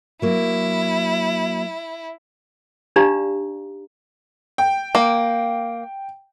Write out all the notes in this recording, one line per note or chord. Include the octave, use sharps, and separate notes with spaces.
F#3 A#3 E4
D4 D#4 G4 D5 F5 A#5
G5
A#3